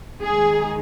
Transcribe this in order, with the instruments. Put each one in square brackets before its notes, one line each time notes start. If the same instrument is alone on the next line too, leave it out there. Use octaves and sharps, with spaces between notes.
[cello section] D#3 G#3 D#4 G#4